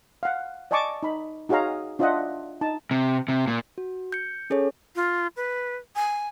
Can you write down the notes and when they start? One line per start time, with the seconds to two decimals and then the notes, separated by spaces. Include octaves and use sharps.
0.23 F5 F#5
0.71 D5 D#5 G#5 A5 C#6 D6
1.03 D#4 B5
1.49 D#4 F#4 G#4 C#5 F5 A#5
1.99 D4 F4 C#5 D#5 E5 F#5
2.61 D#4 A5
2.91 C3
3.28 C3
3.47 A#2
3.78 F#4
4.12 G6 C#7
4.50 C#4 G#4 A4 C#5
4.96 F4
5.36 B4
5.96 G#5